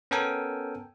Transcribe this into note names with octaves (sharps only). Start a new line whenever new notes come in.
B3 C#4 A4 A#4 G5 G#5